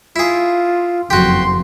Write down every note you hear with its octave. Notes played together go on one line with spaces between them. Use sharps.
E4 F4 G#4
F#1 F2 F#4 G4 C6